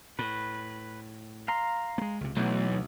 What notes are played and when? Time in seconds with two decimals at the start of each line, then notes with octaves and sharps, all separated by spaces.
0.19 A2 B4
1.48 F5 A#5 C6
1.98 G#3 A#3
2.21 C#2 C3
2.37 B1 E3 A3 B3
2.71 D2